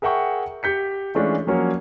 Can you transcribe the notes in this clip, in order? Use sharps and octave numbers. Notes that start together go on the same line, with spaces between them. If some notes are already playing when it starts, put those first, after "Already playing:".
G#4 A#4 E5 F#5 G5 C#6
G4 G6 B6 C#7
E3 G#3 A3 C#4 D4 F4
F3 F#3 A#3 C#4 F#4 C#5